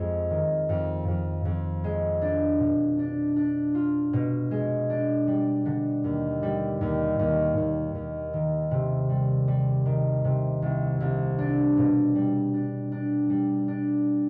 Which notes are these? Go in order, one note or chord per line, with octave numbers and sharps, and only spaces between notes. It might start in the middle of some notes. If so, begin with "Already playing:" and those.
Already playing: F2 G#3
D#3
F2
F2
F2
G#3
D4
B2
D4
D4
F4
B2
G#3
D4
G3
D3
D#2
G3
D#2
D#2
D#2
D#2
D#3
C3
G3
G3
D#3
C3
C2
C2
D4
B2
G3
D4
D4
G3
D4